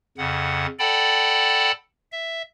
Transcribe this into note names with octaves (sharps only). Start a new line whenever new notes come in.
F2 C#3 F#5
A4 D5 F#5 G5 A5 B5
E5